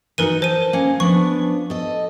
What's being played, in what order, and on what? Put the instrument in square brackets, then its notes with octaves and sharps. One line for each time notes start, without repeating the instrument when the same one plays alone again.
[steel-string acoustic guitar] E3 D#4 F#4 [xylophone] A#4 B4 D#7
[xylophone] C5 D#7 [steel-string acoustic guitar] A5
[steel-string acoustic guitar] A#3 C#4
[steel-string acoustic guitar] F3 B3 D4 [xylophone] C#6
[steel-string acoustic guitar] A4 D#5